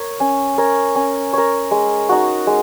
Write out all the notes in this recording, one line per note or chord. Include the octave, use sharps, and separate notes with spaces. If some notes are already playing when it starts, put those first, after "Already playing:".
Already playing: A#4 C#5
C#4
A#4 C#5
C#4
A#4 C#5
G#3
D#4 F#4
G#3